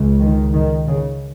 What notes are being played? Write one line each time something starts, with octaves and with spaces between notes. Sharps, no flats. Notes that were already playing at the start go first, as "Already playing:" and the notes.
Already playing: C#2 C#3
D#3
D#3
C#3